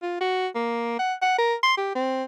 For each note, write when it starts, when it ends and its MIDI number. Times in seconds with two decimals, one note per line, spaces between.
0.02 0.15 65
0.20 0.47 66
0.55 0.98 58
0.99 1.14 78
1.21 1.38 78
1.38 1.55 70
1.63 1.77 84
1.77 1.92 67
1.95 2.23 60